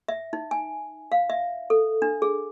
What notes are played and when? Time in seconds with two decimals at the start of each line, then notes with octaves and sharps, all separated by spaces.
0.08 E5
0.33 D#4
0.51 G#5
1.12 F5
1.30 E5
1.70 A4
2.02 D4
2.22 G#4